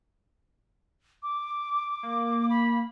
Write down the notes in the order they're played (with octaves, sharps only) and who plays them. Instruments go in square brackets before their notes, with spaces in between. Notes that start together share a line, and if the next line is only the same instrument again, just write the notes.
[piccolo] D6
[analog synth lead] A#3
[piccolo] B5